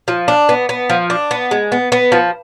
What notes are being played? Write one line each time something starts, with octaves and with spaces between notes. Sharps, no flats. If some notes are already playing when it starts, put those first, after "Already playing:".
F3
D4
B3
B3
F3
D4
B3
G#3
B3
B3
F3